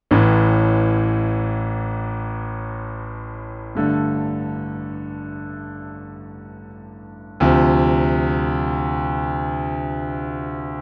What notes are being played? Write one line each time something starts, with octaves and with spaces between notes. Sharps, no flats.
A1 A2 E3
G2 D3 A3
D2 C3 F3